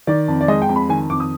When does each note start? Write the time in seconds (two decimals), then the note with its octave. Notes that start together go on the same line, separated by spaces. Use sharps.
0.07 D#3 D5
0.28 F2
0.41 D5
0.48 G#3 D#5
0.62 G5
0.69 F2
0.76 B5
0.89 D#3 G#5
1.10 F2 D6
1.20 D#6